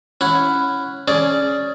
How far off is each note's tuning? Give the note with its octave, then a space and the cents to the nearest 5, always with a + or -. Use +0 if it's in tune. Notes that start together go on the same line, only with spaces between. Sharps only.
C#4 +0 E4 +10 F#5 -10
C#4 +0 G#4 +20 D5 -5